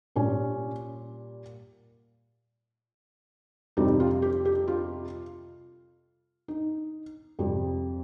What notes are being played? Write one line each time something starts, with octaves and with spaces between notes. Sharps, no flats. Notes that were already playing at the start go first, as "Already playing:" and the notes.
A#2 G3 C#4
F2 C3 G3 D#4
F4
G4
G4
F4
D#4
F2 C3 G3